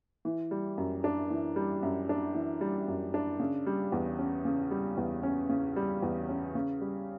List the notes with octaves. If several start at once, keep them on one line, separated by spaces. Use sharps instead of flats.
E3
G3
F#2
D4
E3
G3
F#2
D4
E3
G3
F#2
D4
C#3
G3
E2
C#4
C#3
G3
E2
C#4
C#3
G3
E2
C#4
C#3
G3